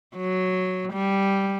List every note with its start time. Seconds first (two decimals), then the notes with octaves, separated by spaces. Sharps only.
0.17 F#3
0.92 G3